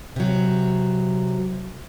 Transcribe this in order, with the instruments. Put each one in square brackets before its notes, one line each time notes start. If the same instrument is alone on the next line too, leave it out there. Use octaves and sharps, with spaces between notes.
[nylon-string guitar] C3 F#3